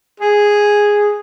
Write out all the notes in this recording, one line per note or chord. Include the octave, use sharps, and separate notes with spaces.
G#4